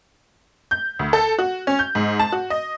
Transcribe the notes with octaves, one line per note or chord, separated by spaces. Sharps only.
G6
D2
A4
F#4
C#4
G6
G#2
A5
F#4
D#5